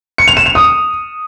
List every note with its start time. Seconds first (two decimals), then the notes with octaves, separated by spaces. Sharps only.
0.18 C#7
0.28 F7
0.37 E7
0.46 F7
0.55 D#6